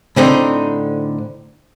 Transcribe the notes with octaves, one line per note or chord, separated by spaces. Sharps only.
A2 D3 C4 D#4